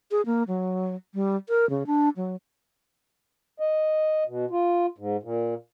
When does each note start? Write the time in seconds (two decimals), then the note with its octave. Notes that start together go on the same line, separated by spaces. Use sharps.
0.11 G#4
0.26 A#3
0.48 F#3
1.14 G3
1.49 A#4
1.70 C#3
1.87 D4
2.16 F#3
3.60 D#5
4.28 B2
4.51 F4
4.98 G#2
5.23 A#2